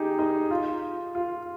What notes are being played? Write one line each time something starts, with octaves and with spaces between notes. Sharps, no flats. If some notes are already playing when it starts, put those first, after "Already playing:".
Already playing: D#4 G4 G#4
D#4
F4
F4